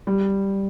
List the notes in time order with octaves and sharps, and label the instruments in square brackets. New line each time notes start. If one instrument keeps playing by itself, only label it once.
[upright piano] G3